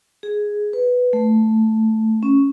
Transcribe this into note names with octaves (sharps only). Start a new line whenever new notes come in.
G#4
B4
A3
C#4